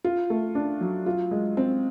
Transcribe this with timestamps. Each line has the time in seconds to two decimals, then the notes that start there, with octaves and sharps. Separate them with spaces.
0.04 F4
0.30 A3
0.55 D4
0.81 F#3
1.06 F4
1.31 G#3
1.57 C4